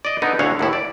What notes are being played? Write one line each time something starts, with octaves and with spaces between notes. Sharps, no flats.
D5 D#5
D3 B3 D#4
D2 D3 E4 C#5 F5 F#5
D#2 A2 E4
D5